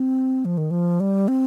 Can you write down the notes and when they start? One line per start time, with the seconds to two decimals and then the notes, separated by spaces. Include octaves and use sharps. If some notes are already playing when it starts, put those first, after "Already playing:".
Already playing: C4
0.45 F3
0.58 D#3
0.71 F3
1.00 G3
1.28 C4